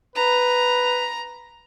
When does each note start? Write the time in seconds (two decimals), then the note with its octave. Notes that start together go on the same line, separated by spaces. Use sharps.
0.16 B4 A#5